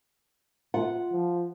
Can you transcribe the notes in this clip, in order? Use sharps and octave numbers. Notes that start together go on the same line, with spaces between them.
F4 F#5
F3